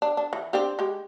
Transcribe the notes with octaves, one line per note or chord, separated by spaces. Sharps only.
D4
D4
E3
C4 D4 G4
G#3 G4